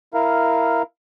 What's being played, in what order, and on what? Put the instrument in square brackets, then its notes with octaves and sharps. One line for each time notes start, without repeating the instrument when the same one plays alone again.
[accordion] E4 A#4 F5